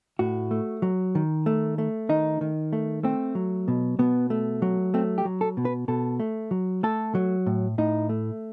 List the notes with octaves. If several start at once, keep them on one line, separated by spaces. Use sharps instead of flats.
A2 F#4
A3
F#3
D#3
A3
A3
D#3 D#4
D#3
A3
A3 C4
F#3
B2
B2 B3
A3
F#3
A3 C4
G4
F#3
A4
B2
B4
B2 A4
A3
F#3
A3 A4
F#3
A2
A2 D#4
A3